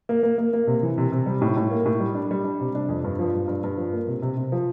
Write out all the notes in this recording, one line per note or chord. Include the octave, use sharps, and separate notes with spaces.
A#3
A#3
A#3
A#3
C3
E3
C3
C3
G3
A2
A2
A#3
A2
G3
D4
G3
D4
C3
D4
F2
G2
F3
G2
G2
G2
F3
A#3
C3
C3
C3
F3